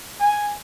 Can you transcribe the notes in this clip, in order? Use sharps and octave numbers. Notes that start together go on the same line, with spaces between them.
G#5